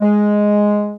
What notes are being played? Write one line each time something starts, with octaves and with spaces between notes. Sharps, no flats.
G#3